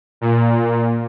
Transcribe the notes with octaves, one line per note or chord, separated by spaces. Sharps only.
A#2